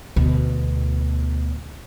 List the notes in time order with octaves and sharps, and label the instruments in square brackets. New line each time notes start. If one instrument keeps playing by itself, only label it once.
[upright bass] D2 B2